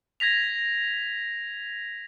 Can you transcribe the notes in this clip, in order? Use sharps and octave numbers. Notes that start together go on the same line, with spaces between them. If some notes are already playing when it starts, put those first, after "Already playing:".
G#6 A#6 B6 F7